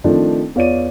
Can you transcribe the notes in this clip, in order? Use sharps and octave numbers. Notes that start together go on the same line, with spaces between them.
D#3 F3 A3 C4 D4
E2 F4 C#5 D5 D#7